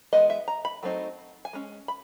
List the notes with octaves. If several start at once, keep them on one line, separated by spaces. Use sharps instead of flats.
E3 G#3 B3 D#5
E5
A#5
B5
F#3 A3 C4 D#4
G#5
G#3 C#4
B5